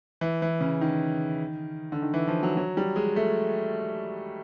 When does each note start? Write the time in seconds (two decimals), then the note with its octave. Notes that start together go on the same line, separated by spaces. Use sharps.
0.21 E3
0.42 E3
0.61 C#3
0.81 D#3
1.92 D3
2.02 D#3
2.14 E3
2.28 F3
2.43 F#3
2.57 F#3
2.77 G3
2.96 G#3
3.16 A3